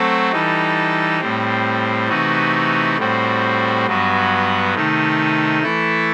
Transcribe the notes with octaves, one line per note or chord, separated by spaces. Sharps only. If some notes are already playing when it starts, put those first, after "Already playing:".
Already playing: F#3 A3 C4 F#4 A4
E3 G3 D#4 A4
A2 G3 C4
C3 E3 A3 D#4 F#4
A2 G3 C4 F#4
G2 F#3 B3 F#4
C3 D#3 A3 D#4
E3 A3 E4 A4